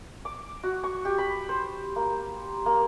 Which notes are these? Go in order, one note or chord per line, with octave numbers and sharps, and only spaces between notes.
D6
F#4
C#6
G4
B5
C5
A#3
A#3